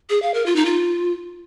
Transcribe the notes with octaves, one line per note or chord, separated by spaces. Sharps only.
G#4
F5
A#4
F4
D#4
F4